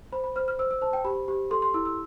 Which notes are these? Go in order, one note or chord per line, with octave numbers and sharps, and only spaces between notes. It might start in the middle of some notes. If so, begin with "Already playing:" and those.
C5 B5
B5
C5 F6
F6
C5 E6
E6
C5 A5
G5
G4 B5
G4
A4 C6
C6
E4 E6
E6